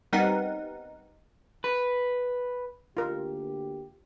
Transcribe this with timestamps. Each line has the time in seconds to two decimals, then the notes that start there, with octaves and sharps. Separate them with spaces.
0.13 G3 B3 C4 D#4 A#4 F#5
1.64 B4
2.97 D2 A#3 F4 G4 A#4